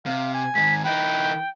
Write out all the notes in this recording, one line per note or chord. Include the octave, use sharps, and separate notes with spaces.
C3 F5
G#5
G#2 D#3 B6
E3 D#4 B4 G5